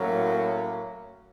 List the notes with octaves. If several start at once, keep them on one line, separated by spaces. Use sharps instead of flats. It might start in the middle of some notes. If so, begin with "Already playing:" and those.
Already playing: A2 F#3 A#3 C#4